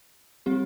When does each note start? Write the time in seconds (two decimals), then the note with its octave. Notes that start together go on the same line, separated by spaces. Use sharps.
0.46 G3 C4 G4